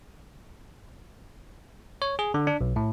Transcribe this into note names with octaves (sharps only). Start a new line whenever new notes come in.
C#5
G#4
D3
D4
B1
A2